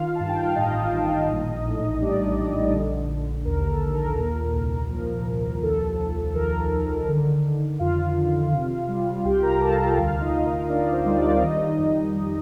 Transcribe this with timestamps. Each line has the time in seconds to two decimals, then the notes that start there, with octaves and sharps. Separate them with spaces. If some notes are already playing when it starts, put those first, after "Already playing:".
Already playing: D#3 F4 F5
0.15 G2 A5
0.29 G5
0.42 F5
0.55 A1 D#4 D#5
0.92 A1
1.28 A#1
1.65 A2
2.01 G3 D4 D5
2.37 A#1
2.74 D3
3.09 D3
3.45 D#2 A#4
3.69 A4
3.82 D#2
3.94 A#4
4.05 A4
4.15 A#2 A#4
4.54 C2
4.90 F3
5.26 C2
5.62 D#2 A4
5.99 D#2
6.26 A4
6.35 D#3 A#4
6.72 D#3
7.07 D3
7.44 D3
7.79 F2 F4 F5
8.16 D3
8.53 C3
8.88 G3
9.24 C2 G4 G5
9.43 A#4 A#5
9.61 C3 A4 A5
9.72 F5
9.79 G4 G5
9.97 D2 F4 F5
10.21 D#4 D#5
10.34 D2
10.46 A#4
10.69 D2 D4 D5
10.93 C4 C5
11.06 G3
11.18 D4 D5
11.36 F5
11.42 D#3 D#4 D#5
11.78 F2
12.14 G3